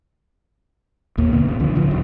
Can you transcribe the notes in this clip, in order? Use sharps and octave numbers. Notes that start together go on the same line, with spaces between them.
A#1 D#2 A#3
E2 B2 D3 B3
A1 C#3
C#2 D3 D#3 F3
A1 D3 E3 F3
D#1 F#3